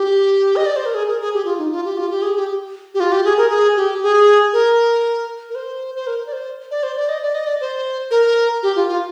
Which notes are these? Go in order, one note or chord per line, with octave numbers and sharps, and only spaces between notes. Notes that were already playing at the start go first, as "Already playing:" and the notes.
Already playing: G4
D#5
D5
C5
A#4
G#4
A#4
G#4
G4
F4
D#4
F4
G4
F4
G4
G#4
G4
G4
F4
G4
G#4
A#4
G#4
G4
G#4
A#4
A#4
C5
C5
A#4
D5
C5
D5
C5
D5
D#5
D5
D#5
D5
C5
A#4
G4
F4
F4